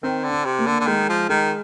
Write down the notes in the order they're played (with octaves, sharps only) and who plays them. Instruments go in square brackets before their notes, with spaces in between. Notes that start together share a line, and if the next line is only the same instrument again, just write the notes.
[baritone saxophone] D#3 [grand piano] C4
[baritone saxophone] D3
[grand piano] C4
[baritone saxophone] C3
[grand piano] A#3
[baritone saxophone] D3
D3
[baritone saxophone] D#3 [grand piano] G#3
[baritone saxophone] F3
[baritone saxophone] D#3 [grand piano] G#3